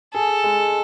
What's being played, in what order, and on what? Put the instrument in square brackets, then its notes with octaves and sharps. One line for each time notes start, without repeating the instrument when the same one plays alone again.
[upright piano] G#4 [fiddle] A4
[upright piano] G#3